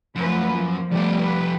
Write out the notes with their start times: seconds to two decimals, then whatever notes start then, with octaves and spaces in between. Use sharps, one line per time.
0.15 F#2 F3 A3 B4
0.50 F3 A#3
0.92 F2 G3 A3 B3 G4
1.21 B4